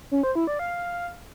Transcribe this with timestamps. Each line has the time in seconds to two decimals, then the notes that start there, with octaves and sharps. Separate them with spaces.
0.11 C#4
0.23 C5
0.35 E4
0.47 D5
0.59 F5